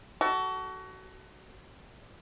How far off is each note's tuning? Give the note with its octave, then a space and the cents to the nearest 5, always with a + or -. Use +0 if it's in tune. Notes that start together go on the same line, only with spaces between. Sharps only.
F#4 +30 A4 +0